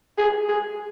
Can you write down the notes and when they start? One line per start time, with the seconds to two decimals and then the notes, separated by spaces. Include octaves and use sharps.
0.18 G#4
0.49 G#4